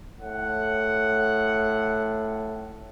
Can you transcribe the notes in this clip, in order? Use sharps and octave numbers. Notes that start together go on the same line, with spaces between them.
A2 F#5